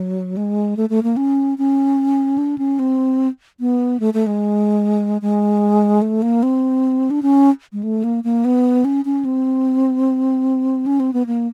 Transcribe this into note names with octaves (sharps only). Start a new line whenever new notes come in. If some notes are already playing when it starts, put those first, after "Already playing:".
Already playing: F#3
G#3
A3
A3
A#3
C#4
C#4
D4
C#4
C4
B3
A3
A3
G#3
G#3
A3
A#3
C4
D4
C#4
G#3
A3
A#3
A#3
B3
C#4
C#4
C4
C#4
C4
B3
A#3